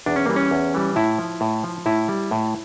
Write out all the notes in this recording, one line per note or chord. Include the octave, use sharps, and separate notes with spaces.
E2 D4
C#4
E3 G3 A#3
C#4
E2
E3 G3
A2 E4
F3
A2
F3
A2 E4
G3
A2